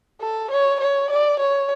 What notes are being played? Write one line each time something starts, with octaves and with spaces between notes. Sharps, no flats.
A4
C#5
C#5
D5
C#5